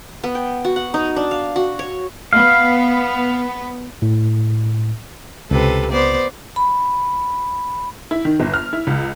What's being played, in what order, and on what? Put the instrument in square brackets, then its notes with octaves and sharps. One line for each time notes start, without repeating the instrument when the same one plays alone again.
[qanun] B3
G5
F#4
F#5
D#4
D4
F5
F#4
C#5
[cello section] B3 [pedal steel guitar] F5
[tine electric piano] A2
[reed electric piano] C#2 [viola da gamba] C3 A4 B4
[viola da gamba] B3 C5 D5
[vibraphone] B5
[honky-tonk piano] E4
D#3
G1
F6
E4
C#2